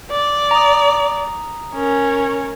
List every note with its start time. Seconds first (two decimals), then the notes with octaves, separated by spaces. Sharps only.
0.11 D5
0.51 A#5 D#6
1.74 C#4 A#4